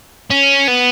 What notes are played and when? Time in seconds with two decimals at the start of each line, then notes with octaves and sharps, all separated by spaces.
0.30 C#4
0.68 B3